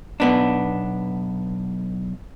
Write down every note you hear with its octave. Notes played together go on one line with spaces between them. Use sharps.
B1 B3 D4